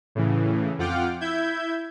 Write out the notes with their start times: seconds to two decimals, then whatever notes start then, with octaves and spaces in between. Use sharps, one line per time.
0.15 A2 C#3 E3
0.78 F2 F4 F#5 G5 D6 F6
1.21 E4 E5 G6 G#6